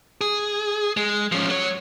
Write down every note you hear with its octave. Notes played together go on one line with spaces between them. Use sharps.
G#4
G#3
F3 C#4
F#3 C#5